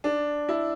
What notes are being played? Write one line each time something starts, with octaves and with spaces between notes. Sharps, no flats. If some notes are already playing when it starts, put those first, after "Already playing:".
D4
E4